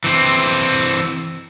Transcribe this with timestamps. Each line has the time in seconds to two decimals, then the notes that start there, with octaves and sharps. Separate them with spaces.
0.04 E3 C4